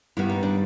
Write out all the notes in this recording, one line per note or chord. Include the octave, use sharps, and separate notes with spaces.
G2 D#3 G3 B3 E4
D#4
D4